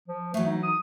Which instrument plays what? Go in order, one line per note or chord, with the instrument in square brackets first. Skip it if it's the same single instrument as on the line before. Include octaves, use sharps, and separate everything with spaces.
[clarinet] F3
[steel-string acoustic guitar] E3 F#3 [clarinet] A3
[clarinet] D#4
D#6